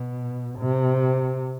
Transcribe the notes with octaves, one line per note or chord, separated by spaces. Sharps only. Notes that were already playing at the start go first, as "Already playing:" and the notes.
Already playing: B2
C3